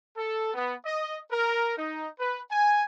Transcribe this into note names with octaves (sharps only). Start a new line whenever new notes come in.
A4
B3
D#5
A#4
D#4
B4
G#5